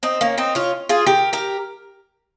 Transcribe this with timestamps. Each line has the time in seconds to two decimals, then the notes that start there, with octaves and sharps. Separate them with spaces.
0.03 C4 D#4
0.21 A#3 C#4
0.38 C4 D#4
0.55 C#4 F4
0.89 F4 G#4
1.06 G4 A#4
1.33 G4 A#4